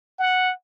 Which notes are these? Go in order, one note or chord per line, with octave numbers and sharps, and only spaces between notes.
F#5